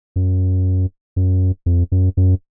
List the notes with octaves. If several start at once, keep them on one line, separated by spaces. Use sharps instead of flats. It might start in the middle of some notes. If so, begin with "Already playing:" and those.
F#2
F#2
F2
F#2
F#2